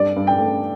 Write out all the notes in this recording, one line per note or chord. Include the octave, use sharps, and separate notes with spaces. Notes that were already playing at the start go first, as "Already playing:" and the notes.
Already playing: G2 D5
G2
G5
A3